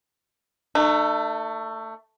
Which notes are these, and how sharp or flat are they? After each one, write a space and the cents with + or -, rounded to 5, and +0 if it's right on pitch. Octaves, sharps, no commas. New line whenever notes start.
A3 +20 D#4 -45